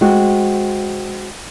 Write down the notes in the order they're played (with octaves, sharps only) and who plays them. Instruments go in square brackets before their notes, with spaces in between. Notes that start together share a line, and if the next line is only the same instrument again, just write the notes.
[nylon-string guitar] G#3 C4 F#4